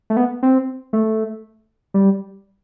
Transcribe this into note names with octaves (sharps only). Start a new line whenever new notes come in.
A3
B3
C4
A3
G3